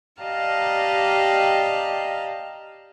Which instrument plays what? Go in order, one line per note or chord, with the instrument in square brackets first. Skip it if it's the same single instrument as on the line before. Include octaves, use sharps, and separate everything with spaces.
[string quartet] G4 D5 D#5 F5 A5 A#5